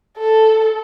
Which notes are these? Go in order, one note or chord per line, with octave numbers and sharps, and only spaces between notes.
A4